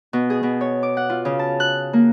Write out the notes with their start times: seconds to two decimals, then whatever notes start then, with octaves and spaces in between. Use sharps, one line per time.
0.13 B2
0.30 G#4
0.43 B2
0.61 C#5
0.83 D6
0.97 F#5
1.10 F4
1.25 C#3
1.39 A5
1.60 F#6
1.93 A#3